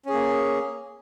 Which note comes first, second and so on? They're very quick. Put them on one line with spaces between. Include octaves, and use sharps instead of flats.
C#4 G#4 A#3